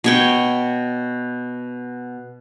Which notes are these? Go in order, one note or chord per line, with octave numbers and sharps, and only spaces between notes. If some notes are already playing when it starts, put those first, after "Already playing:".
B2 C#5 G5